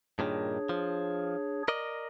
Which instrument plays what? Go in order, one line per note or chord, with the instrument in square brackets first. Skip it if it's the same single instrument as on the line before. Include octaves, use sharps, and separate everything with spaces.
[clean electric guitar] G2 A#2 D#3 [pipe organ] D4 G#4 C#5
[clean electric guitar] F3
A#4 D5 D#5